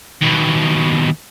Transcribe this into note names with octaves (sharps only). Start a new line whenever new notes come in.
D#2 B2